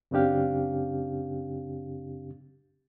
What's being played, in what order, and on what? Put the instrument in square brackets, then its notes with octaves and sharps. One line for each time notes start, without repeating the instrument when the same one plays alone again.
[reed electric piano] F#2 C#3 C4 D4 G4 F5